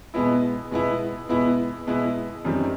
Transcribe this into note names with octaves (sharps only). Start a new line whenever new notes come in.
B2 G#3 B3 E4
B2 G#3 B3 E4
B2 G#3 B3 E4
B2 G#3 B3 E4
F#2 D#3 G3 C4